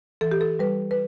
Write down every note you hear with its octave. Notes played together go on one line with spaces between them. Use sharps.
E3 A4
G4
A4
G3 B4
B4